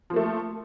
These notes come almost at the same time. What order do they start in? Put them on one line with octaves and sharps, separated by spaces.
F3 A#3 A3